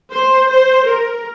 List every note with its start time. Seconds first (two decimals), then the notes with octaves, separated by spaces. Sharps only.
0.13 C5
0.50 C5
0.86 A#4